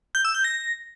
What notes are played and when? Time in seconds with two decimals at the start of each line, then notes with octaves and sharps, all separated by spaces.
0.15 G6
0.25 E6
0.35 G6
0.44 A#6